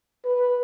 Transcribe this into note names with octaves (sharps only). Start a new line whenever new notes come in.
B4